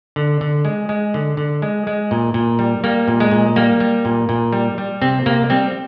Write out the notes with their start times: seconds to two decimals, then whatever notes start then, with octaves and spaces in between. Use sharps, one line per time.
0.16 D3
0.41 D3
0.65 G#3
0.89 G#3
1.14 D3
1.37 D3
1.62 G#3
1.87 G#3
2.11 A#2
2.34 A#2
2.59 G3
2.84 G3 A#3
3.08 A#2
3.20 G#3
3.31 A#2
3.56 G3 A#3
3.80 G3
4.05 A#2
4.29 A#2
4.53 G3
4.78 G3
5.02 C3 C4
5.26 C3 A#3
5.50 G3 C4